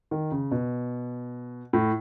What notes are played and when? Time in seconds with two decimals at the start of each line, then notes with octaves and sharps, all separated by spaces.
0.11 D#3
0.32 C#3
0.51 B2
1.73 A2